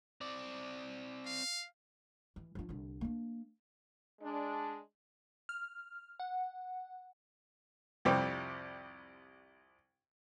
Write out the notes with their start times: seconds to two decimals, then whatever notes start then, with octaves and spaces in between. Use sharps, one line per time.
0.21 C4 D5
1.26 F5
2.36 E3
2.55 F3 D4
2.69 C2 D3
3.01 A#3 D4
4.22 G#3 D4
5.49 F6
6.20 F#5
8.05 C2 F2 C3 G3